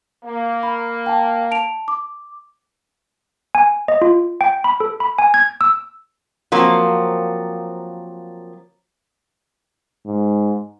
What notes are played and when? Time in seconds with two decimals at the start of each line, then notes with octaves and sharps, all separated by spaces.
0.23 A#3
0.63 B5
1.06 G5 A5
1.51 A5 D7 F7
1.88 D6
3.55 G#5
3.88 D#5
4.02 F4
4.41 G5
4.64 B5
4.80 A4
5.00 B5
5.19 G#5
5.34 G#6
5.61 E6
6.52 F3 F#3 A#3 C4
10.06 G#2